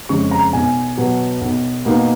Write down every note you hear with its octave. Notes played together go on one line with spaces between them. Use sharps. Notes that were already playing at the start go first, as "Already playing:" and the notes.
F2 C#3 G#3 C#6
A#5
B1 G#5
B2 F#3
B1
B2 A#3 D#4